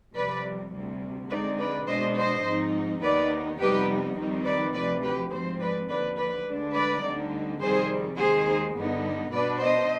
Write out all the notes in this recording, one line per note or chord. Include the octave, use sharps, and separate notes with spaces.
F2 C3 G3 B4 D5
D2 C3 G3
D3 G#3 C4 D#4 B4 D5
B4 D5
B2 G#3 D4 C5 D#5
C5 D#5
G#2 F3 C4 D#4
D#2 D#3 B3 D#4 B4 D5
F2 C3 G3 B3 D#4 G4 B4
F2 D#3 G3 C4 D#4
B4 D5
D2 C3 F3 B4 D5
G4 B4
G#2 F3 G#3 C4 G#4 C5
B4 D5
D#2 D3 F3 B4 D5
B4 D5
D2 D3 G#3 D4
B4 D5
D2 D3 G3 C4 D#4
F2 C3 D#3 G3 G#4 C5
D#2 D#3 G#3 G#4 C5
G2 D3 G3 B3 D#4
B2 B3 D4 B4 D5
C5 D#5